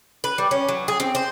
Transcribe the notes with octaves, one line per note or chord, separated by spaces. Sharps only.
B4
G3
C#4
F#3
G#4
C4
C5